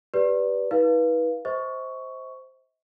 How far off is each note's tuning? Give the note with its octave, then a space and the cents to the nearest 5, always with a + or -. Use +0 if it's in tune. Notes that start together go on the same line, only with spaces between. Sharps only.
G4 +0 B4 +0 D5 -10
E4 -45 B4 -25 F5 -10
C5 +0 D#5 +45 C#6 +10